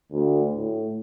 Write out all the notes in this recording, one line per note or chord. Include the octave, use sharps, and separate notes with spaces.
D2
A2